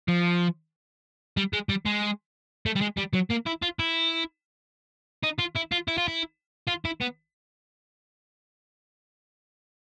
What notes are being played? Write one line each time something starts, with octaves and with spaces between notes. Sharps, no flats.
F3
G3
G#3
G3
G#3
A3
G3
G#3
G3
F#3
A#3
E4
F4
E4
D#4
F4
E4
F4
E4
F4
E4
F4
E4
B3